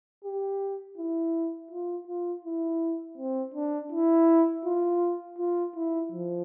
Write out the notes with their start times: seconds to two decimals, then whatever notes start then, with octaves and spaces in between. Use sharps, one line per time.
0.24 G4
0.98 E4
1.71 F4
2.07 F4
2.45 E4
3.18 C4
3.54 D4
3.92 E4
4.65 F4
5.39 F4
5.75 E4
6.12 F3